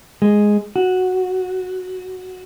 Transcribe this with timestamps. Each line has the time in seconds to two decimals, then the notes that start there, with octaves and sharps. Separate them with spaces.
0.22 G#3
0.76 F#4